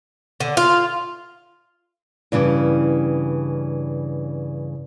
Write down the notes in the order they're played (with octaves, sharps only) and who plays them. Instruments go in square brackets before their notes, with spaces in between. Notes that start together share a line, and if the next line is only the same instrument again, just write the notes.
[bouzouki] D3
F4
[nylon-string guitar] G2 C#3 E3 G3